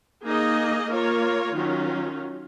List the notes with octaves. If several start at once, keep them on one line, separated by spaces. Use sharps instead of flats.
A#3 D#4 G#4 D#5
A#3 F4 A#4 C#5
D#3 F#3 C#4 F4